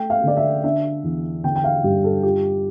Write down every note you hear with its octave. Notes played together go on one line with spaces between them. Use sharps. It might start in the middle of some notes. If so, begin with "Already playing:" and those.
Already playing: A3 G5
F5
D3 D5
E5
D4 E5
E2
D3 G5
G5
F5
G2 G4
A4
F4 G4